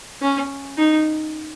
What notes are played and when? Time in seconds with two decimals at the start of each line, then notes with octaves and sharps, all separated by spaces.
0.22 C#4
0.78 D#4